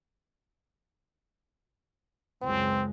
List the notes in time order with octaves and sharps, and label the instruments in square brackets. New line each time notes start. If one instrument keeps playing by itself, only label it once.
[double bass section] C#2 F#2 G#3 [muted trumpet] C4